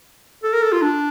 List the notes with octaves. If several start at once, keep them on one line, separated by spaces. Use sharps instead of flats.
A4
A#4
A4
F4
D4